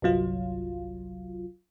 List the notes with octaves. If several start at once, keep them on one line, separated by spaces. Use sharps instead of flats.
G1 C2 F#3 F4